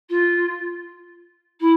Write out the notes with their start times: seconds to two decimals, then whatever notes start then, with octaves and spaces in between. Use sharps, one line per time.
0.09 F4
1.60 E4